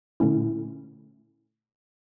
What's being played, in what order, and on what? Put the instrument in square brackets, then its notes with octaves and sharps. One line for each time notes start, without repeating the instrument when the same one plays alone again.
[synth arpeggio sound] A#2 D3 A3 C#4 E4